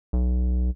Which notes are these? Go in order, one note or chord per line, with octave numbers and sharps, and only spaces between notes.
B1